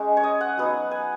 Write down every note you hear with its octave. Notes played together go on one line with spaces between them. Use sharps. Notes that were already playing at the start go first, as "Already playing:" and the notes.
Already playing: G#3 C#4 D#4
C#5
D#5
F#5
F#3 B3 D#4
G#5